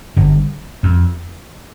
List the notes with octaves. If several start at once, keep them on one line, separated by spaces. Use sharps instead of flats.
G1 G2
F2